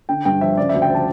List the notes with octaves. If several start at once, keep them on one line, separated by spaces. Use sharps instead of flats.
D3 G5
G2 G5
F3 E5
C#3 D5
D2 E5
G5
F3 A5